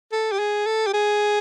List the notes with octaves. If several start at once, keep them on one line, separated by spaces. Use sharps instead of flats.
A4
G4
G#4
A4
G4
G#4